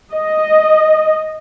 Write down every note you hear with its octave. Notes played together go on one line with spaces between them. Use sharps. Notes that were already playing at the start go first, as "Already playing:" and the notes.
D#5